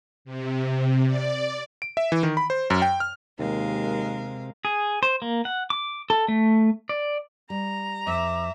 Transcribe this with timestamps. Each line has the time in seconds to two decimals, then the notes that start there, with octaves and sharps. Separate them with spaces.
0.25 C3
1.06 D5
1.82 D7
1.97 E5
2.12 E3
2.23 D#3
2.37 B5
2.50 C5
2.70 F#2
2.82 G5
3.00 F6
3.39 D#2 C3 G#3 A#4 F5
4.65 G#4
5.03 C5
5.22 A#3
5.45 F#5
5.70 D6
6.10 A4
6.28 A3
6.89 D5
7.50 G3 A#5
8.07 F2 E5 D6